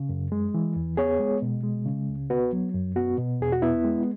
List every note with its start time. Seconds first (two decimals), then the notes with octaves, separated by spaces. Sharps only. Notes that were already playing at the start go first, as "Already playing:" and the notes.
Already playing: C#3
0.09 F#2
0.32 G#3
0.54 E3
0.76 E2
0.97 B3 G#4 C#5
1.20 G#3
1.42 B2
1.63 G#3
1.86 C#3
2.09 C#2
2.30 B3 F#4 B4
2.53 F#3
2.74 F#2
2.96 B3 F#4
3.18 B2
3.41 E2 G#4
3.52 F#4
3.62 B3 E4
3.85 G#3